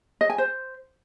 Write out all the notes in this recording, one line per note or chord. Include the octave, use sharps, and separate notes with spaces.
D#5
G#5
C5